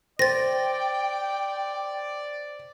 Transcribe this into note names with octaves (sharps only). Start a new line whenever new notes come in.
C5 D5 G5 A6 A#6